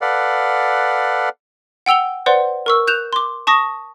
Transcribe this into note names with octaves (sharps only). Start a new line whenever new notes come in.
A4 B4 D5 F5 F#5
F#5 G5 E6 F7 G7
B4 C5 D5 F#5 C6
A#4 C#6 E6
F#6 G6 E7 F7
C6 D6
A5 C#6 D#6 A#6